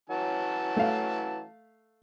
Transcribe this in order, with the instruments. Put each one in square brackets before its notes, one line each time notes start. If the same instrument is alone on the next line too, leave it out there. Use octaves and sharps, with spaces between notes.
[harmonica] E3 C#4 A5 [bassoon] F#3
[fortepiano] A3 F5